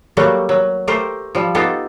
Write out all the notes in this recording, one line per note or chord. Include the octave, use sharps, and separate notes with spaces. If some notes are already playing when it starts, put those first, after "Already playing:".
F#3 G3 A3 A#3 F#4 G4
F#3
A3 G4 A#4 C5
F3 G3
B3 D#4 F4 G4 A4